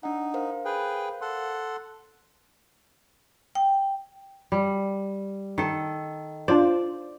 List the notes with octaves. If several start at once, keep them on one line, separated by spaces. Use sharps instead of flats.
D4 D#4 F#5
A#4 C5 F5
G#4 B4 G5
A4 F#5 C6
G5
G3
D#3 A4
D4 F4 C5 D5